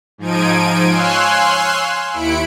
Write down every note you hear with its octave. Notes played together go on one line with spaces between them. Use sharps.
G#2 F3 D#4 G#6 D7 D#7
C#5 F5 G#5 C6 E6 F#6
D#2 E4 B5 C#7 D7